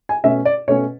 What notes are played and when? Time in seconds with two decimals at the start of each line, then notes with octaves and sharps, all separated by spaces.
0.09 G#5
0.24 B2 A3 C#4 E5
0.45 D5
0.68 B2 A3 C#4 C#5